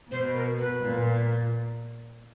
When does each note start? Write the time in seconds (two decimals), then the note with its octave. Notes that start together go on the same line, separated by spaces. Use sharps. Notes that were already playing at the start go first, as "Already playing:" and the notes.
0.11 B2 C5
0.34 A#4
0.59 B4
0.82 A#2